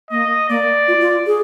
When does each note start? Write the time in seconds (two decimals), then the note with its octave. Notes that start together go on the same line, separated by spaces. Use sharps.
0.10 A#3 D#5
0.49 A#3 D5
0.88 F4
1.01 F4
1.27 G#4